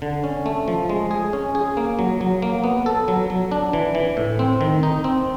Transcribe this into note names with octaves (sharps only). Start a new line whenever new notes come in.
D3
C#4
A3
F3
G#3
G#4
C#4
G#4
A#3
F#3
F#3
A#3
B3
A4
F#3
F#3
D4
E3
E3
A2
C4
D#3
D#4
C4